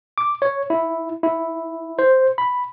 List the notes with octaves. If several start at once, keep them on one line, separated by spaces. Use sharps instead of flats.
D6
C#5
E4
E4
C5
B5